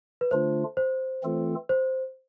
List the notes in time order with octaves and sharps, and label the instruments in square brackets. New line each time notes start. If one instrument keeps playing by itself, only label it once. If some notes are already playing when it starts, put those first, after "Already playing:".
[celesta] B4
[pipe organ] D3 A3 D4 F4 [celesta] C5
[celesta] C5
[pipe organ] E3 A3 C4 F4 A4
[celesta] C5